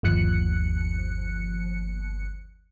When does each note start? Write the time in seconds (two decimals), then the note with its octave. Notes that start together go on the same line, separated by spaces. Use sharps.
0.03 G1 D#2 F3 F#6 C#7